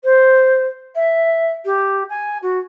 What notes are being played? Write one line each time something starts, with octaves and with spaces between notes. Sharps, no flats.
C5
E5
G4
G#5
F#4